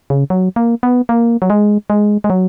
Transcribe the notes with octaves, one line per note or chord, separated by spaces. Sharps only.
C#3
F#3
A#3
B3
A#3
F#3
G#3
G#3
G#3
F#3